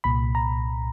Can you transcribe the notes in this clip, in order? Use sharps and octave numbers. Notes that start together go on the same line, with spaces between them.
C2 A#2 B5
A#5